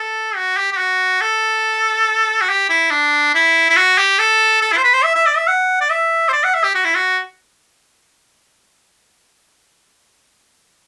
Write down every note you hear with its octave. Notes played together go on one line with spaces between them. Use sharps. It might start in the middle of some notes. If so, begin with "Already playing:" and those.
Already playing: A4
F#4
G4
G4
F#4
A4
F#4
G4
E4
D4
E4
E4
F#4
G4
A4
A4
E4
C5
B4
C5
E5
E5
D5
E5
F#5
D5
E5
C5
D5
F#5
E5
G4
F#4
E4
F#4